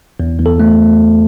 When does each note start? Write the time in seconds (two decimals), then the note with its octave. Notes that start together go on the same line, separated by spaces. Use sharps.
0.20 E2
0.39 E2
0.46 A4
0.60 A3